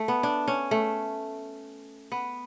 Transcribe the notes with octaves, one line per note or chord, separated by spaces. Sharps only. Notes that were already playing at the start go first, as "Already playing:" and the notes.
Already playing: A3
B3
D4
C#4
A3
B3